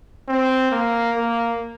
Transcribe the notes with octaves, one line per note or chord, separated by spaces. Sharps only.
C4
A#3
A#3